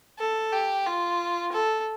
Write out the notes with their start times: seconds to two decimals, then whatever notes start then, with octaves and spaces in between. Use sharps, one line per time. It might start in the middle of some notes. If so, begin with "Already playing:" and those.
0.19 A4
0.53 G4
0.86 F4
1.52 A4